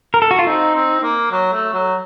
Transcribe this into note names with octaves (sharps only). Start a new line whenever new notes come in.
A#4
A4
F#4
F4
C4 D#4
C4
A#3
F#3
A3
F#3